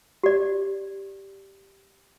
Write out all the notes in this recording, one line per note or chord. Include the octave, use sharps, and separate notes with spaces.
G4 D5